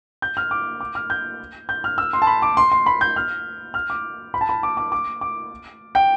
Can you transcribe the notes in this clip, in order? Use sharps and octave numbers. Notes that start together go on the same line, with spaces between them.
G6
F6
D6
D6
F6
G6
G6
F6
E6
C6
A5
B5
D6
C6
C6
B5
G6
F6
F6
D6
B5
A5
B5
D6
D6
D6
D6
G5